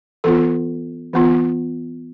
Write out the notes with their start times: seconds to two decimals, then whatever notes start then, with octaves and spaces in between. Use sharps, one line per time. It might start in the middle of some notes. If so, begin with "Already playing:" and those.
0.24 E3 B3 F4 A4
1.13 E3 B3 F4